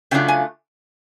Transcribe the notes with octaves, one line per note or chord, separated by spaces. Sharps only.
C#3 F#3 A3 D4 F4 G5
G#5